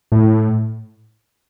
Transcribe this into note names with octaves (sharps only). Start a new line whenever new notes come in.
A2